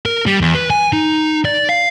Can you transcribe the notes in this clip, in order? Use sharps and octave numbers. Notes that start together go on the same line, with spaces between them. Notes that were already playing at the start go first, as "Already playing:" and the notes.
A#4
G3
E2
B4
G#5
D#4
D5
F5